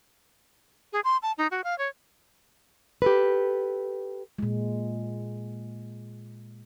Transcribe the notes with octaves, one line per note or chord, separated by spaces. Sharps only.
G#4
C6
A5
D#4
F#4
F5
C#5
G4 A4 B4
A#2 G#3